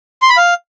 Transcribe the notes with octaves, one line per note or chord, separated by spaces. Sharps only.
C6
B5
F5